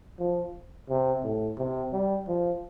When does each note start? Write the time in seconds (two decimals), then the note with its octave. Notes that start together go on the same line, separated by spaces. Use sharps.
0.19 F3
0.89 C3
1.24 A2
1.58 C3
1.93 G3
2.28 F3